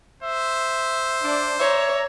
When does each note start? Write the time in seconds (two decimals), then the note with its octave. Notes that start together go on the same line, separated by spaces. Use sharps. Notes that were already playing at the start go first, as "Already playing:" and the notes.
0.23 C5 E5
1.23 D4
1.59 C#5 D5 E5 A#5